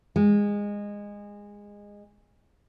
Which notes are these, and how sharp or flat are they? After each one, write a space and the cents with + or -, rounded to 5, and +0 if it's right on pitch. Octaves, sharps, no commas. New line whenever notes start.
G#3 -20